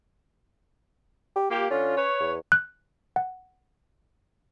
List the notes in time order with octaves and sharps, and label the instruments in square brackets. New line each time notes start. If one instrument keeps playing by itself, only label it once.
[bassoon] G4
[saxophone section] A#3 G4 [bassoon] F4
[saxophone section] D3 F4 [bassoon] C#4
[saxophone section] B4 C#5
[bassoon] E2
[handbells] F#6
F#5